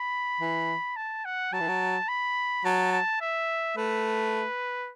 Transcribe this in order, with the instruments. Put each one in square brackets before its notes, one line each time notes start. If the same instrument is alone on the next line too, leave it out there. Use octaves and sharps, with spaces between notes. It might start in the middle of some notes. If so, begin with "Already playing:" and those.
Already playing: [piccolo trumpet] B5
[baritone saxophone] E3
[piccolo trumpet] A5
F#5
[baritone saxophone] F#3 [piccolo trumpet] A5
[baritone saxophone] E3
F#3
[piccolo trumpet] B5
[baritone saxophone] F#3 [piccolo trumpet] A5
[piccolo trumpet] A5
E5
[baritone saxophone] A3 [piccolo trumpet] B4